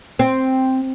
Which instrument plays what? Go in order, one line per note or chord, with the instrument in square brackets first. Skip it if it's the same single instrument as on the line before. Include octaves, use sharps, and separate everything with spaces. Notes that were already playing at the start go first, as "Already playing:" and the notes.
[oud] C4